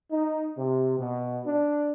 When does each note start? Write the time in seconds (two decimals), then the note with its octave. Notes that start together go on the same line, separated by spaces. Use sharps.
0.11 D#4
0.57 C3
0.98 B2
1.45 D4